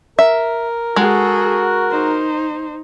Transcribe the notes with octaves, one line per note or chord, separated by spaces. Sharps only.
A#4 E5
G#3 F#4 G#4 A4
D#4 C5